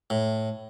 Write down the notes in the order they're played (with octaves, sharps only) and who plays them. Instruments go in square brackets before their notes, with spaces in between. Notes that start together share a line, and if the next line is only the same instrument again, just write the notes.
[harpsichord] A2